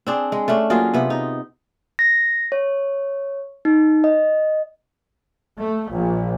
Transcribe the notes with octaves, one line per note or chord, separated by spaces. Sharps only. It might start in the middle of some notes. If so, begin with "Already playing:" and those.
C4 D4 G#4
G#3
A3 C#4 D4
F#3 A#3 F4 G#4
C3 B3
D#4
A#6
C#5
D#4
D#5
A3
A#1